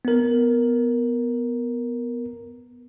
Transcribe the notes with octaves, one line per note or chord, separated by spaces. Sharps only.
B3 A#4